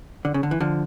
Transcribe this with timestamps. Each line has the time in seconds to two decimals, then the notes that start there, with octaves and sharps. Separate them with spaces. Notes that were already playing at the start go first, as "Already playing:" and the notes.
0.25 D3
0.34 C#3
0.43 D3
0.51 E3
0.60 D3 F3